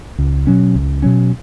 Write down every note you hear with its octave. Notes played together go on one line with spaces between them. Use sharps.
C#2
B2 F#3 C#4
C#2
B2 F#3 C#4